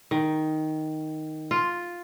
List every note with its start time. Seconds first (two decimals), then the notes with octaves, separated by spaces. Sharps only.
0.11 D#3
1.51 F4